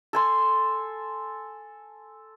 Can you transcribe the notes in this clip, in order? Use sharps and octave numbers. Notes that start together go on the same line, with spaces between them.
A4 G#5 C6